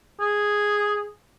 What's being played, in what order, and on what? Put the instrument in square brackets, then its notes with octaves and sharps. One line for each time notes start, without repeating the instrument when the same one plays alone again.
[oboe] G#4